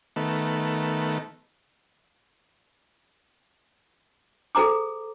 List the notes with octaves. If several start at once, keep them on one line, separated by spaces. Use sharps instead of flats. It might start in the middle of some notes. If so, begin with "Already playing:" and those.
D#3 A3 B3
G#4 A4 C5 A#5 D6